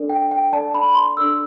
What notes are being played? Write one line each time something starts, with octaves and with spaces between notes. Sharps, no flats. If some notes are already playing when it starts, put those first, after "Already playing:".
Already playing: D4 A4 D5
G5
G5
D4 A4 D5 A5
B5
C6
D4 A4 D5 E6